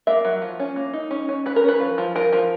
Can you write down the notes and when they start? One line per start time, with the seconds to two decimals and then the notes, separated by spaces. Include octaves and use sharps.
0.07 A#3 E5
0.25 F#3
0.42 F3
0.59 C#4
0.76 A#3
0.93 D#4
1.11 C#4
1.29 C#4
1.46 C#4 B4
1.56 A#4
1.64 C#4 B4
1.80 F3
1.98 F3
2.16 F3 A#4
2.33 F3